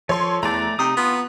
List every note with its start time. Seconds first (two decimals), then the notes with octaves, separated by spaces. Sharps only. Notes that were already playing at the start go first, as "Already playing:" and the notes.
0.09 F3 A4 C#5 C6
0.43 E2 A3 D5 A#5
0.79 C3 D#4 D#6
0.97 B3 F4